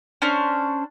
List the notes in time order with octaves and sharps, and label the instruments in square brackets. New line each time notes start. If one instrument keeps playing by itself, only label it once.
[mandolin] C#4 D4 C5